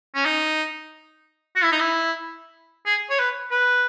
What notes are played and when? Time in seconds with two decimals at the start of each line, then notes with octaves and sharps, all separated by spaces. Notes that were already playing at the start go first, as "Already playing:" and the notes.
0.15 C#4
0.25 D#4
1.56 F#4
1.63 E4
1.72 D#4
1.80 E4
2.86 G#4
3.10 C#5
3.19 B4
3.51 B4